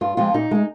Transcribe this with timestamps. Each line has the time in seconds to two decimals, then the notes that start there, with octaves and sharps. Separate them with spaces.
0.01 G2 F4
0.17 F3 G#3 C4 F4
0.34 A#2 D#4
0.51 G#3 D#4